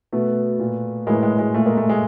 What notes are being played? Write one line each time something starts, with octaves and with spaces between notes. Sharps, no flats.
B2 A3 B3
A#2
A2 E3 G#3 A#3
G#3
G#3
A#2 A3
G#3 A#3
A3
G#3